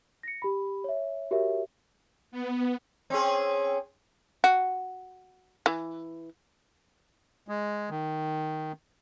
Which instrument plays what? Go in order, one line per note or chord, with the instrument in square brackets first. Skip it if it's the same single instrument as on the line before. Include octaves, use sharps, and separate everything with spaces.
[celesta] A#6 C#7
G4 B5
C#5 E5
F#4 G4 A#4 C#5 E5
[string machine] B3
[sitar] C4 C#4 G#4
[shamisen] F#4
E3
[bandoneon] G#3
D#3